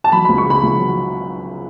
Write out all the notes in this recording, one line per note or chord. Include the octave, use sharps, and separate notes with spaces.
A5
F#3 B5
C#2 B5
C#6
C#3 B5
C#2
F#3